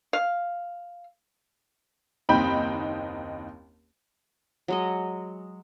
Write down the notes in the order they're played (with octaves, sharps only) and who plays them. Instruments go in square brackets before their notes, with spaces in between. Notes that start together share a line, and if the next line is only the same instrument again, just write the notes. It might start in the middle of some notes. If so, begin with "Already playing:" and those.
[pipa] F5
[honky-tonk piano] F#1 D#2 C4 D#4 G5 B5
[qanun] F#3 G#3 D#5